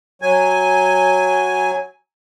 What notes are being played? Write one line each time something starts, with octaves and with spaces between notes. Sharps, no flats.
F#3 G#5